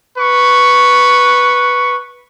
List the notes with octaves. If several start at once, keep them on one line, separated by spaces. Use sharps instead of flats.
B4 C#6